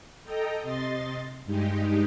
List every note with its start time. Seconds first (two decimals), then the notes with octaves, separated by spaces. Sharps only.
0.24 A4 D#5 G5 A#5
0.62 C3 D#5 C6 A6
1.45 G2 G#3 D#4 G4